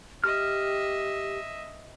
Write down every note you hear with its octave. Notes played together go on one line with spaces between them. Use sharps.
G4 D#5 E5 F6